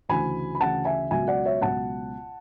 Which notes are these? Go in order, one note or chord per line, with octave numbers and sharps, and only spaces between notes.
D2 C#3 E3 G#5 B5
B5
D2 C#3 E3 F#5 A5
E5 G#5
C#2 B2 F#3 E5 G#5
D5 F#5
C#5 E5
C#2 B2 F#3 F#5 A5